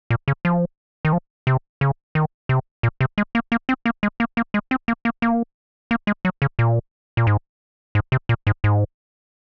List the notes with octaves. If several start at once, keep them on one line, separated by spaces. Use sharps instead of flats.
A#2
C#3
F3
D#3
F3
C3
C#3
D#3
C3
A#2
C3
G#3
A#3
A#3
C4
A#3
G#3
A#3
A#3
G#3
C4
A#3
A#3
A#3
A#3
G#3
F#3
C#3
A#2
A#2
G#2
G#2
C3
A#2
G#2
G#2